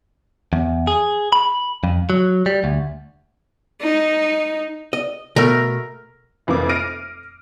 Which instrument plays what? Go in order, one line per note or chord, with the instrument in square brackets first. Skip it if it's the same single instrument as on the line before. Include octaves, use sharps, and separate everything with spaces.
[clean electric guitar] E2
G#4
B5
F2
F#3
G3
D2
[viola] D#4
[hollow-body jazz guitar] D#5
[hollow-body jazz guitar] B2 A3 [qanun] A#4
[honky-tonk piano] F1 F2 E3 A#3 D6
F6 A#6 C7 D7 D#7